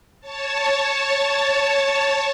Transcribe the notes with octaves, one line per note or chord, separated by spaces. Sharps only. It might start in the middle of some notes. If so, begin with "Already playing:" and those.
C#5 A5